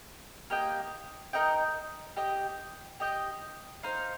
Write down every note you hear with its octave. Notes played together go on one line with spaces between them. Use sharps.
A#3 G4 D#5 G5
D#4 A#4 D#5 G5
G4 D#5 G5
G4 D#5 G5
D#4 C5 F5